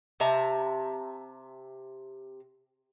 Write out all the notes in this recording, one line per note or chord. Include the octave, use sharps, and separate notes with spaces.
C3 E5 A5 A#5